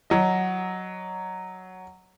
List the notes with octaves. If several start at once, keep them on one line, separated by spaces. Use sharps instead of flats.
F#3 D#5